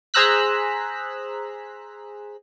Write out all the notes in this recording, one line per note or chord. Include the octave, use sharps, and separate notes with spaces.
G#4 C5 A#5 E6 F#6 B6